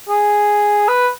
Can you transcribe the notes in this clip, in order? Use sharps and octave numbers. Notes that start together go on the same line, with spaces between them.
G#4
B4